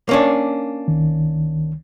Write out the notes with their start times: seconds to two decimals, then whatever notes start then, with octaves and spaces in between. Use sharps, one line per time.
0.09 A#3 C#4 D4
0.88 C2 D#3